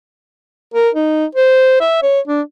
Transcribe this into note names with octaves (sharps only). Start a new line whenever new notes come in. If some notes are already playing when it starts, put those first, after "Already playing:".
A#4
D#4
C5
E5
C#5
D4